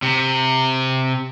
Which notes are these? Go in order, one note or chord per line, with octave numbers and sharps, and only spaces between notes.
C3